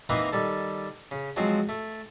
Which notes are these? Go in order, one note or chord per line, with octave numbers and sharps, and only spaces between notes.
E3 A#3 C4 D#4 A#4 B4
D#3 G3 A4
C#3
F3 F#3 G#3 C4
A3